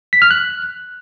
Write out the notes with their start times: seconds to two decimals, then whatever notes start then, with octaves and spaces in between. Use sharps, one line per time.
0.13 B6
0.22 F6
0.31 F#6